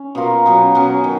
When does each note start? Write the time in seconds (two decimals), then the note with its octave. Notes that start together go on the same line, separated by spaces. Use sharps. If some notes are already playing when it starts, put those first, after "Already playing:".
Already playing: C#4
0.15 B2 A#3 F4 A#4
0.46 B2 F#3 C#4
0.75 B2 F#3 C#4
1.04 D#3